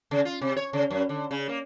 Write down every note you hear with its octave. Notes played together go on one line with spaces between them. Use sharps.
C#3
F4
C3
C#5
C#3
F#2
D3
C#3
A#3